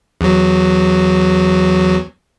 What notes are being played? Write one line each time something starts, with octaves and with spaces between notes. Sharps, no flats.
E2 F#3